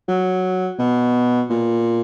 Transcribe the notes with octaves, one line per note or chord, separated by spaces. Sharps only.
F#3
B2
A#2